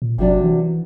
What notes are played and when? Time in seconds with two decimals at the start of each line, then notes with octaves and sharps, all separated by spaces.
0.02 A#2
0.18 G1 C3 F#3 D4
0.41 E3